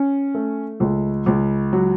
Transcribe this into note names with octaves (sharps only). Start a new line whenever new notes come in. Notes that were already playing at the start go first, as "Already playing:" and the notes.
Already playing: C#4
A3
C#2
C#2
F#3